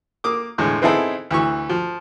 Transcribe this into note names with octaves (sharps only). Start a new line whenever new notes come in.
A#3 D6 D#6
E2 A2 D3 G#3
B3 C4 D#4 E4 G#4 A4
D2 E3 C#6
F3